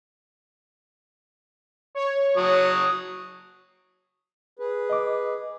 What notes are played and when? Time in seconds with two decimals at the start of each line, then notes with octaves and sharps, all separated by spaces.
1.95 C#5
2.37 F#3 D#6
4.59 G#4 B4
4.90 D#5 D6